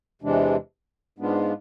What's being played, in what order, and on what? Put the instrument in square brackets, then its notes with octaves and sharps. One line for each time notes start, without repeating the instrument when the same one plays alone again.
[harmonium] E2 C3 E3 G#3 D4
G#2 G#3 B3 D4 F4